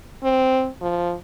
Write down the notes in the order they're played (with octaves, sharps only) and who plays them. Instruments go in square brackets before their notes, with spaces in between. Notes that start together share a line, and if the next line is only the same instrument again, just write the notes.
[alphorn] C4
F3